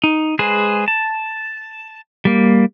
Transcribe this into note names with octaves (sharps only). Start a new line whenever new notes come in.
D#4
G#3 G#4 B4 C5
A5
G3 A#3